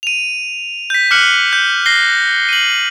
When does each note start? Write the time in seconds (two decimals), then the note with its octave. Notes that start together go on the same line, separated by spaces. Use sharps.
0.03 D#7 F7
0.90 G6 B6
1.11 D6 F6 F#6 C#7 F#7
1.53 G6
1.86 A#6 C7 G7
2.49 D#7 F#7